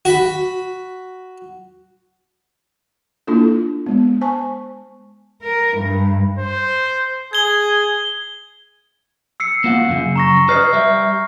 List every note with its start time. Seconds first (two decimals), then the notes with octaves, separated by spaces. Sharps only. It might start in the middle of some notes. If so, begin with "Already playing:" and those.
0.05 F#4 B5
3.27 A#3 D4 E4 F4 A4
3.86 G#3 B3
4.21 C5 G#5 A5 C#6
5.42 A#4
5.77 G2
6.39 C5
7.33 G#4 G#6 G7
9.40 E6 C7 C#7
9.64 A#3 F4 F#5
9.89 F#2 C#3
10.16 A#5 C#6 A#6
10.49 B4 D5 D#5 F6 C7
10.73 G3 E5